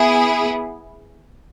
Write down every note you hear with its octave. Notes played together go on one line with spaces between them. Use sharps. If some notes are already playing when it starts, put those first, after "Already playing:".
Already playing: B3 E4 G#4